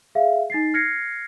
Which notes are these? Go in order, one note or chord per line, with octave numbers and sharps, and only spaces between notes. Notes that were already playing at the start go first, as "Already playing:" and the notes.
G#4 E5 F5
D#4 A6 C7
F6 G#6 A#6 C7 C#7